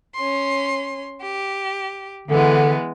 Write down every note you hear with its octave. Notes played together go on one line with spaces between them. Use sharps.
C#4 C6
G4
D3 E3 G#3 B3